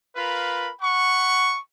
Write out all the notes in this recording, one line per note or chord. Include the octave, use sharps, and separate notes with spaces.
F4 A#4 B4 F5 B5
F#5 B5 C#6